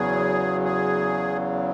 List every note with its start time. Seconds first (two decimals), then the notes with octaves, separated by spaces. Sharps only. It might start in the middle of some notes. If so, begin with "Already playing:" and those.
Already playing: E2 C#3 F#3 G#4
0.64 G#4